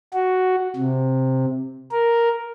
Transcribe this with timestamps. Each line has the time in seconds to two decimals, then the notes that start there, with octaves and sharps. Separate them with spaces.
0.13 F#4
0.76 C3
1.92 A#4